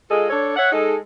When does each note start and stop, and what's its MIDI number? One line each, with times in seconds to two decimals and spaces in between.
0.10 0.28 56
0.10 0.28 65
0.10 0.28 68
0.10 0.28 69
0.10 0.28 75
0.30 0.53 62
0.30 0.53 69
0.30 0.53 73
0.55 0.68 73
0.55 0.68 76
0.55 0.68 78
0.72 0.95 56
0.72 0.95 63
0.72 0.95 68
0.72 0.95 69